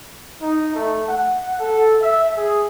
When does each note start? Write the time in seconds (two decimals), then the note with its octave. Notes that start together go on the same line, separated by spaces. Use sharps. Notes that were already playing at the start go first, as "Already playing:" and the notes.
0.40 D#4
0.73 A3
1.06 F#5
1.58 A4
2.01 E5
2.36 G#4